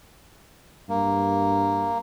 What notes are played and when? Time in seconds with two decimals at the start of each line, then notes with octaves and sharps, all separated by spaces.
0.89 G2 A#3